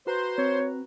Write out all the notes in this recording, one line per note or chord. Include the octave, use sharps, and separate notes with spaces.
F#4 B4 C5 A#5 C6
C4 C#5